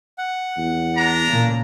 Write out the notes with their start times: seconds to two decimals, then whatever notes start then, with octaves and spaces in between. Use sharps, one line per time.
0.18 F#5
0.58 E2
0.95 D4 A#5
1.29 A#2 C#3 A#3